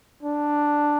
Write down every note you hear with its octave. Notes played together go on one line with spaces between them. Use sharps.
D4